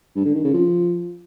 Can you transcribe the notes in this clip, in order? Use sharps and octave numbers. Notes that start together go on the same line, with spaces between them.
G2
D3
D#3
C#3
F3